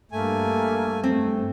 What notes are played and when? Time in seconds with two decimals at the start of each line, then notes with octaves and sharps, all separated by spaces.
0.12 G2 A3 A#3 G#5
1.04 A3 C4